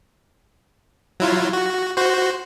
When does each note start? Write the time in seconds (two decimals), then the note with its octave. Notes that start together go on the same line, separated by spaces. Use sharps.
1.20 F#3 E4 F4
1.53 F#4
1.97 F#4 C5